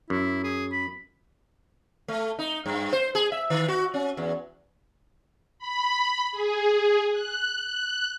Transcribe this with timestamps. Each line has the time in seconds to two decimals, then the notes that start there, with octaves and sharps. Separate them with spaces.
0.10 F#2 E4
0.44 G#4
0.72 B5
2.08 A3
2.39 D#4
2.66 G2
2.93 C5
3.15 G#4
3.32 E5
3.50 D#3
3.68 F#4
3.94 C#4
4.17 E2
5.59 B5
6.32 G#4
7.11 F#6
7.64 F#6